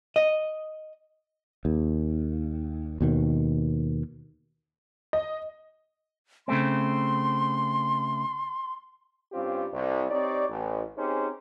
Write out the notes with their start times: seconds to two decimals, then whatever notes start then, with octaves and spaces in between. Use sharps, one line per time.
0.16 D#5
1.65 D#2
3.01 D#2 B2 D#3
5.13 D#5
6.48 C#3 A3 C4 C6
9.32 G2 C4 C#4 F4 G4
9.72 C2
10.10 C4 D#4 G4 C#5 D5
10.49 A1
10.97 C4 C#4 D#4 G4 G#4 C5